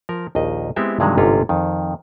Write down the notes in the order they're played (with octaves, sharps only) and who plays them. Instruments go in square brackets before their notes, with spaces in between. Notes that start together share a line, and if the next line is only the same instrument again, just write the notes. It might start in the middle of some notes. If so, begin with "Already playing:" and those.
[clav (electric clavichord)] F3 A#4
A#1 D#2 D#3 D#5
G#3 B3 C4 E4 G4 E5
G2 C3 D#3 E3 F#3 G#3
G1 G#2 C3 C#4 F4
F2 D#3